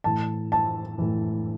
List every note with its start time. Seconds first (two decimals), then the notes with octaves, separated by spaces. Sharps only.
0.04 A2 E3 A5
0.52 A5
0.98 A2 E3